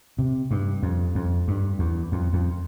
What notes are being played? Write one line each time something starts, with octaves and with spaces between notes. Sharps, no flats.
C3
G2
F2
F2
G2
E2
F2
F2